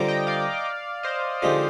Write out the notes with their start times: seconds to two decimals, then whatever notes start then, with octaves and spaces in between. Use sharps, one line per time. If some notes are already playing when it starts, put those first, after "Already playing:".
Already playing: D3 G3 C4 F4 A#5 D6
0.08 D#5 G5
0.27 D5 F5
1.03 C5 D#5
1.42 D3 F3 G#3 D#4 G4